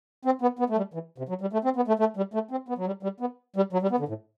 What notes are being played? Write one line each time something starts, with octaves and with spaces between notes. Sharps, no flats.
C4
B3
B3
A3
G3
E3
C3
F#3
G3
A3
C4
B3
A3
A3
G3
A3
C4
B3
F#3
G3
G3
B3
G3
F#3
G3
B3
D3
A2